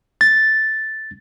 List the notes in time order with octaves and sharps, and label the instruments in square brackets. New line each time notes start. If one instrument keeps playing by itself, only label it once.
[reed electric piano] A6